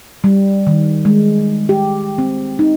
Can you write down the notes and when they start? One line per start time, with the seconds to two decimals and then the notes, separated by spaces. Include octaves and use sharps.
0.24 G3
0.67 D#3
1.05 G#3
1.69 G4
2.18 C4
2.59 D#4